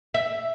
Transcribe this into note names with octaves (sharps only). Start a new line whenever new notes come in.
E5